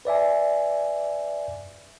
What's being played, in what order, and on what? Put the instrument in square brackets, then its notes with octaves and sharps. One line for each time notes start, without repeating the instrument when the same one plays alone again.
[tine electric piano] B4 D5 E5 G#5